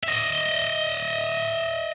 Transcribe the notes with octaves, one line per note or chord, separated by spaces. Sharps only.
D#5 E5